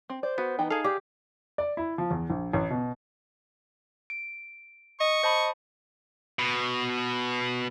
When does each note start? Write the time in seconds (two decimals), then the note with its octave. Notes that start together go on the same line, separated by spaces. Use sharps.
0.10 C4
0.23 C5 D5
0.38 B3 F#4
0.59 E3 D#4 G5
0.71 G#4 A4 F5
0.84 G4 D5
1.58 D5
1.77 E4
1.98 F3
2.10 E2
2.30 A#1
2.54 A1
2.70 B2
4.10 D7
5.00 D#5 C#6
5.23 C5 D#5 A5 B5
6.39 B2